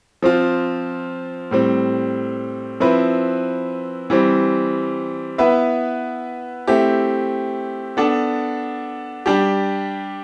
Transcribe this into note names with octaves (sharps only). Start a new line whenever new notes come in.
F3 C4 F4
A2 G3 C4
F3 C4 E4 B4
E3 G3 C4
B3 E4 B4 E5
A3 C4 E4 G4
B3 D4 A4
G3 D4 G4